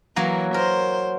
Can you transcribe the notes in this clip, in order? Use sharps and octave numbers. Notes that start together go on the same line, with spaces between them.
E3 F#3 A#3
A#4 C5